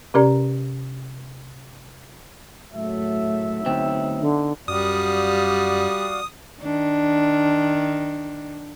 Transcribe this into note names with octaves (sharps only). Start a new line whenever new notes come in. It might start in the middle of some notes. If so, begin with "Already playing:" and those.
C3 C#4 G4 A#4 D5 A#5
F#1 A2 F#3 A3 E5
D2 B3 C4 D#4
D3
F#2 G3 F#4 D5 F5 D#6
D#3 D4